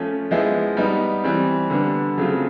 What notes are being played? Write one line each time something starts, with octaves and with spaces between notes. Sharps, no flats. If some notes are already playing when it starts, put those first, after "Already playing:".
Already playing: F3 A3 C#4
F3 G#3 B3 E4
G3 B3 D#4
E3 G3 C4
D3 G3 B3 D4
C#3 F#3 A3 C4 F4